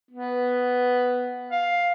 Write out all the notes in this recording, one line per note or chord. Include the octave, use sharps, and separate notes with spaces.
B3
F5